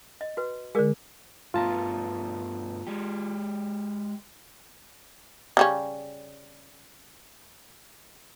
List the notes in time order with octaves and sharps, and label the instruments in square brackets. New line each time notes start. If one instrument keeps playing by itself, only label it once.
[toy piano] D#5
F#4 B4
[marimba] D3 G#3 [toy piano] G#4 A#4 D5
[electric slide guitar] G2 A3 B3 [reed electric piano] F4 A5 A#5
[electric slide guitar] G#3 G4
[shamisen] C#3 G3 C#4